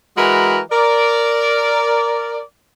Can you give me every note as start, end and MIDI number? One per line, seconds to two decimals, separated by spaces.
0.16 0.59 52
0.16 0.59 56
0.16 0.59 66
0.16 0.59 70
0.16 0.59 82
0.16 0.59 83
0.71 2.39 70
0.71 2.39 74